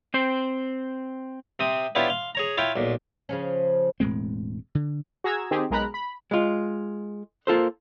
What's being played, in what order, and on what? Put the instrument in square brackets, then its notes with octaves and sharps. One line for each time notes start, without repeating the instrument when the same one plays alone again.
[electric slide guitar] C4 C5
[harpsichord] C3 C4 D#6
B3 D4 E4 F4 G4 C#5
F5 C6
G#4 C#5 A#5
E4 F4 C#5 F5 G5
B1 A#2
[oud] C#3 F3 C#4
[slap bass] E1 A2 G#3 C4
D3
[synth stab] F#4 G#4 A#5 E6 G#6
D#3 C4 G4 G#4
B1 G#3 A#4 A#5 B5 F#6
B5
[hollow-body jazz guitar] G#3 F4
A#3 F4 A4 C5